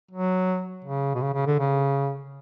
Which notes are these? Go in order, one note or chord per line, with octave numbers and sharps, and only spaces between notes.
F#3
C#3
B2
C#3
C#3
D3
C#3